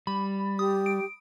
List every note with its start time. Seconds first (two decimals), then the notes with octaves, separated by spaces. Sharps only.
0.07 G3 B5
0.59 G4 D#6
0.86 D7